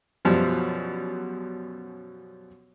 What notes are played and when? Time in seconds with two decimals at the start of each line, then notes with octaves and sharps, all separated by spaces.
0.25 F#2 B2 F3 G3